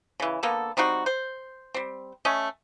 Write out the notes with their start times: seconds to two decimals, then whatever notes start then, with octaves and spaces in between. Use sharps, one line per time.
0.20 C#3 E3
0.43 D3 A#3 B3 A4
0.77 G3 C4 D#4 F#4
1.06 C5
1.74 G3 C4
2.25 A3 C#4 D#5